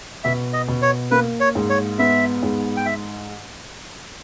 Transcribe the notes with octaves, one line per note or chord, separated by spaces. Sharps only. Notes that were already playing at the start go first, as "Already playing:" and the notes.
B2 E5
D#5
B2
C#5
A#3 B4
C#5
G#2
C#5
B3 E5
G#2
G5
E5